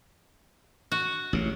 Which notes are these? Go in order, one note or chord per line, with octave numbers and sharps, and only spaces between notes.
F#4
A1 C#3